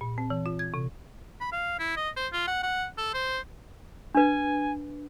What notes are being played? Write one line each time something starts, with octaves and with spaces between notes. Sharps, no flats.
A#2
C4
E3
F4
G#6
C3
B5
F5
E4
D#5
C5
F4
F#5
F#5
A4
C5
D4 B4 G#5